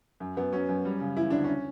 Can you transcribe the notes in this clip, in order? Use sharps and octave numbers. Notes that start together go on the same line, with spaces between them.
F#2
F#2 B3
F#3 C#4
F#2
G3
C#3
E3 E4
D2 D4
C#4